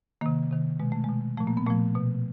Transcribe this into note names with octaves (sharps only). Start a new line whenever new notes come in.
C3 D#3 A#3
C3 D#3
B2 G#3
A3
B2 G#3
A#2 F3 A3
A#3
B3
A#2 F3 A3
B2